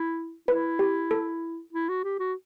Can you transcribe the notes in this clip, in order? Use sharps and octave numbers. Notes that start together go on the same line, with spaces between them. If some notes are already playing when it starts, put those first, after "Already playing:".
Already playing: E4
E4 B4
G4
A4
E4
F#4
G4
F#4